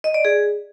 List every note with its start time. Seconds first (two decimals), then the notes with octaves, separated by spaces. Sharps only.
0.04 D#5
0.14 D5
0.25 G#4